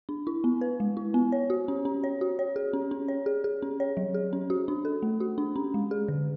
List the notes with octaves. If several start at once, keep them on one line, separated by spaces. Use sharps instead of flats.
D4
E4
B3
B4
G#3
E4
B3
C#5
F#4
C#4
C#4
C#5
F#4
C#5
G#4
C#4
C#4
C#5
G#4
G#4
C#4
C#5
F#3
G#4
C#4
F#4
D4
A4
A3
F#4
D4
C#4
G#3
G#4
D3